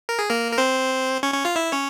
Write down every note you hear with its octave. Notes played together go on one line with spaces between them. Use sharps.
A#4
G#4
A#3 A#4
A#4
C4 C5
C#4 C#5
C#4 C#5
F4 F5
E4 E5
C#4 C#5